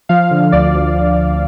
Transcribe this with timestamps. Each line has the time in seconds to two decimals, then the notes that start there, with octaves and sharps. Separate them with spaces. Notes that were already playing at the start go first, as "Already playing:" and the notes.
0.09 F3 F5
0.31 D3
0.52 D2 D5
0.74 D2